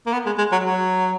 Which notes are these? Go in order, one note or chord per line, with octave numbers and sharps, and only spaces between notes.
A#3
B3
G#3
G#3
F#3
F#3